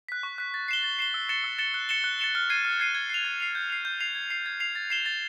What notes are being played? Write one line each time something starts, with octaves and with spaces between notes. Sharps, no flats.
F#6 B6
C#6
F#6 B6
A6
C7 E7 G7
A6
C7 E7 G7
E6
A6 C#7 E7 G7
E6
A6 C#7 E7 G7
F#6
A6 C#7 E7 G7
F#6
A6 C#7 E7 G7
F6
G#6 C7 D#7
F6
G#6 C7 D#7
G#6
C7 F7
G#6
C7 F7
G6
C7 F7
G6
C7 F7
G#6
C7 F7
G#6
C7 F7
A6
C7 E7 G7
A6